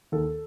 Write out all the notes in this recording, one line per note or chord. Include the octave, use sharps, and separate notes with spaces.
D#2 A4